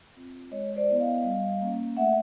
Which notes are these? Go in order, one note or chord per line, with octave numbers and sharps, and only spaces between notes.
C4 F4
G#3 C#5 D#5
C5 D5
B3 E4
D#5 F5
G3
A#3 C#4
A3 E5 F#5